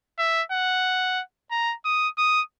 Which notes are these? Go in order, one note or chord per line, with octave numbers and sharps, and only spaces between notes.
E5
F#5
A#5
D#6
D#6